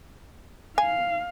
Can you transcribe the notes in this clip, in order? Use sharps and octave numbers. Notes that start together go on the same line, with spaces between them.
F5 G#5